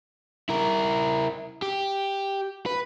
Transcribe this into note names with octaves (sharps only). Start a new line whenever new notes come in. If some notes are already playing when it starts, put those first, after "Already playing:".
E4 A#4
G4
B4